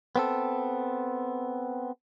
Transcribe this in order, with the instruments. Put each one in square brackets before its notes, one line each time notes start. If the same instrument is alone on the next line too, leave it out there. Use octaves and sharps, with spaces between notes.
[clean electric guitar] B3 C4 A4